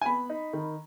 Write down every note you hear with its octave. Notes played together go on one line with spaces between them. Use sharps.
G#5
B3 B5
D#4
D#3